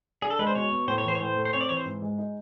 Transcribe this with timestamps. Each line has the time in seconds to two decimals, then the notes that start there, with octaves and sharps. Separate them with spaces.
0.22 D4 G#4
0.30 A4
0.39 G#3 B4
0.47 C5
0.55 B2 C#5
0.71 B3
0.88 A2 C5
0.98 C#5
1.04 E3 C5
1.15 C#5
1.20 A2 C5
1.36 A3
1.45 C5
1.53 C4 C#5
1.61 D5
1.69 E3 C#5
1.77 C5
1.85 G#2
2.02 G#3
2.18 D#4